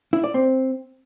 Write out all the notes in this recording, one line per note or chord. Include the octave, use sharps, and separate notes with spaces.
E4
D5
C4